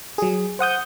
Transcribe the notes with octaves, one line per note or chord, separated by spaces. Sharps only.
F#3 G#4
C5 F#5 D#6 G6